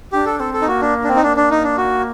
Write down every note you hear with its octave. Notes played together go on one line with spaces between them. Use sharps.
D4 G4
A4
C4 A4
A4
D#4
A#3 F#4
D4
D4
C4
D#4
A#3 D4
D4
D#4
D4
F#4